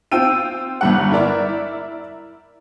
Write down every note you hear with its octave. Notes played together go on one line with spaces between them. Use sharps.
C4 F4 G5 E6 D#7
G1 G2 F#5
E4 A#4 D5 E5